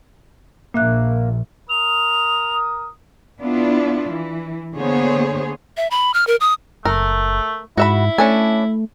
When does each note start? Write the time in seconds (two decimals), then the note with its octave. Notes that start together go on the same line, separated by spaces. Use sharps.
0.74 A#1 A#2 A#3 E5 F#6
1.70 A#4 D#6 F7
3.41 B3 D4 E4 F4
4.11 E3
4.75 D3 A#3 B3 G#4 C5 C#5
5.77 E5
5.91 B5
6.14 F6
6.27 A#4
6.41 D#6
6.85 F#1 A3 A#4
7.78 G#2 E4 F#4 E5 B5
8.18 A3 C#4 D4 G#5